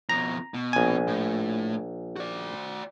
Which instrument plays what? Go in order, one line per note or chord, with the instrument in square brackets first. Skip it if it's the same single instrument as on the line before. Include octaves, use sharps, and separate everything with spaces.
[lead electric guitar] F2 B2 [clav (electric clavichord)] A#5
[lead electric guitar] B2
[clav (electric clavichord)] A#1 G#5
[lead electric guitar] A2
F#4 D5